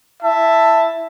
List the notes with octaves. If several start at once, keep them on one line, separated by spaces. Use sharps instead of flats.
E4 E5 A5